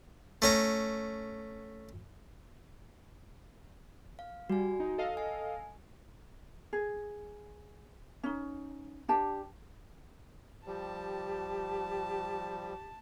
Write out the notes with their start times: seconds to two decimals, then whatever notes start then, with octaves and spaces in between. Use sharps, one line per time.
0.42 A3 C#4 A#5
4.19 F5
4.50 G3 F#4 G#5
4.80 D#4
4.98 A4 D#5 F5
5.17 G#5
6.73 G#4
8.23 C#4 D#4
9.08 D4 G4 A5
10.67 F3 G3 G4 A5